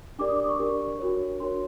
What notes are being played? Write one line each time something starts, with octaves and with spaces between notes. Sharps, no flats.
D4 G4 A#4 D5 D6
D#6
D6
C#6
D4 G4 A#4 D5
D4 F#4 A#4 C#5
D4 F#4 A#4 C#5 C6